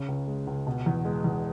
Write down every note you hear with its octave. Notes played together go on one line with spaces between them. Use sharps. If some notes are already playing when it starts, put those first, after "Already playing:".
Already playing: C#3
C#2
G#3
C#2
B2
E2
G#3
E2